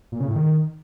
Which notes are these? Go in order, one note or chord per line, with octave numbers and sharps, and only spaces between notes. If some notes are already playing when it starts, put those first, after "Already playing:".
A#2
C#3
A2
D#3